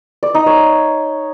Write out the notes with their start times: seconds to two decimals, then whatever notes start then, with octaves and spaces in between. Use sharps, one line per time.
0.23 D5
0.34 D#4
0.46 C#5